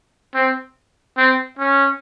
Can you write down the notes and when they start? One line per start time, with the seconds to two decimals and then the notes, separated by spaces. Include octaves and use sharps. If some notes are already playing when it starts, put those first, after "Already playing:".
0.35 C4
1.17 C4
1.59 C#4